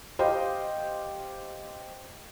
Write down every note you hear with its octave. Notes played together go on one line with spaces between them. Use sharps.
G4 C5 D#5 F5 G5